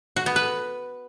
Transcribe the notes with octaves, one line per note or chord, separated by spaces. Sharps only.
F#4
B3
B4